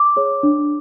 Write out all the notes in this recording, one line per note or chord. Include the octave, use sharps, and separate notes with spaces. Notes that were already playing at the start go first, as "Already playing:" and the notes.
Already playing: D6
G#4 C#5
D4